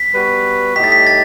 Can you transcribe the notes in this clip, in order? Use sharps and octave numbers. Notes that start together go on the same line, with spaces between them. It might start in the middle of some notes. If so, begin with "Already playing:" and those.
Already playing: B6
G3 B3 F#4 B4
A2 G3 D#4 G4 D#5 B6
A6
B6
A6